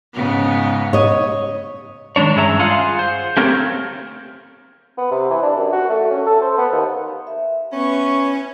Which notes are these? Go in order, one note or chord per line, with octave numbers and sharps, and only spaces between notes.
G#2 C#3 B3
C#5 D#5
D#3 G#3 C4 D4 C#5
G2 C#4 G#4 E5 A5 A#5
F4 G#4 F5 F#5 G#5
C5
A3 A#3 C4 G4 A#4 C#5
B3
C3
E3
D4
F#2
F#4
A3
C#4
A4
C5
B3
D#2
E5
B3 C#4 C#6